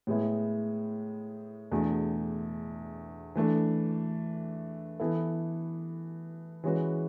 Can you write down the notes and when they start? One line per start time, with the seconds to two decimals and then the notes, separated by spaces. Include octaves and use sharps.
0.07 A2 G#3 B3 E4
1.72 E2 B2 A3 D4 G#4
3.35 E3 A3 D4 A4
5.00 E3 B3 E4 A4
6.64 E3 G#3 C#4 F#4 B4